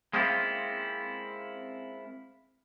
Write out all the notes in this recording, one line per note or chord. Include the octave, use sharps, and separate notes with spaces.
G#3 A#3 C4 C#4 E4 F4